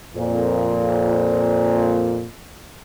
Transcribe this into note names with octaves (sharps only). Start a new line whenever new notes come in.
F2 A#2